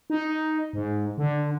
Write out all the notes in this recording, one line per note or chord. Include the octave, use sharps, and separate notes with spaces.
D#4
G#2
D3